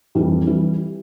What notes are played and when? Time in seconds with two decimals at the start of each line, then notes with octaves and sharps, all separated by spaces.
0.15 F2 E3 G3
0.47 E3 G3